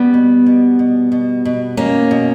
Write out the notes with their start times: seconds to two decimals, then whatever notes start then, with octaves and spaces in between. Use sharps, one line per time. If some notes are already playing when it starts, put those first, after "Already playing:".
Already playing: G3 B3
0.14 B2
0.46 B2
0.79 B2
1.12 B2
1.45 B2
1.77 B2 A#3 C#4
2.11 B2